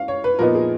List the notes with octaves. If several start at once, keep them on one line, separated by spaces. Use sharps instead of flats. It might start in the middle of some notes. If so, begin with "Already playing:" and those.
Already playing: C#4 F5
C#5
B4
A#2 F3 B3 D#4 A#4
G#4